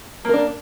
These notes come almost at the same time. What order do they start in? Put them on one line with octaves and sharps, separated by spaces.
A#3 A#4 D4